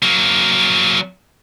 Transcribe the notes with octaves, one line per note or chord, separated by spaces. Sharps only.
F#3 A#3